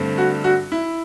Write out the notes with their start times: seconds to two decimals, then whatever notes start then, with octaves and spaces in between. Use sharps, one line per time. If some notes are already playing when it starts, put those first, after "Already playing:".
Already playing: G2 D3 A3 C4
0.18 F#4
0.44 F#4
0.72 E4